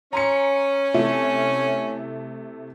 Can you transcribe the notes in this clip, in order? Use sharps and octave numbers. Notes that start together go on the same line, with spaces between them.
C#4 A#5 C6 C#7
C3 A3 E4